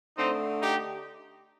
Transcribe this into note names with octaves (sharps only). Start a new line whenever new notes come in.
D3 A3 C4 D#4
D#4 G4